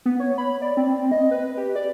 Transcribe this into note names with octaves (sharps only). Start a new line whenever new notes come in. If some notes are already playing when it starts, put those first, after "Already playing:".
B3
C#5
B5
D5
C4
D#5
B4
G4
D5